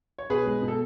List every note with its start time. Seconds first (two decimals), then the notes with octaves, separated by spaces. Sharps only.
0.18 C#5
0.30 B2 G#4 B4
0.46 G#3
0.62 B2
0.68 A4